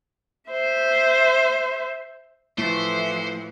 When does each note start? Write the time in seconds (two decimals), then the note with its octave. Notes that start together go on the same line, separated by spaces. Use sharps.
0.50 C5 E5
2.58 A2 E3 F3 A3 C5